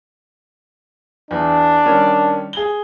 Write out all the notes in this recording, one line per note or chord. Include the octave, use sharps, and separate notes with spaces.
E2 D4
D#3 G3 C#4
G#4 G7